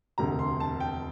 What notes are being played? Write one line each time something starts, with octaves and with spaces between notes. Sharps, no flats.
E1 D2 C3 A#5
C6
A5
G5